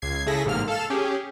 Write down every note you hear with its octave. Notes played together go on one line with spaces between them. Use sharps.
C#2 G#6 C7
C#3 E4 G#4 A4 A#6 B6
A1 G#2 C3 A#3 F6
A4 F5 F6 E7
C#4 G4 G#4